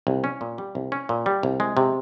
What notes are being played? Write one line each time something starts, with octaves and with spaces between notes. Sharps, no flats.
C2
C#4
A#2
G3
C2
C#4
A#2
G3
C2
G#3
C3